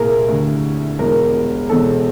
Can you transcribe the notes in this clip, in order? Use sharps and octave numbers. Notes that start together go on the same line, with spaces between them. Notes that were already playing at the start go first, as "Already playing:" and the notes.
Already playing: C2 A#2 G#4 A#4
D2 D3
E1 E2 B2 A#4
E1 E2 B2 A4